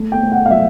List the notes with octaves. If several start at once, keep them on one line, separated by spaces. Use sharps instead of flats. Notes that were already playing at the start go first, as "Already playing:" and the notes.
Already playing: A3
G5
A3
F#5
F5
F#3 E5